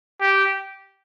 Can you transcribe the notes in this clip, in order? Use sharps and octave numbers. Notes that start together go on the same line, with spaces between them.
G4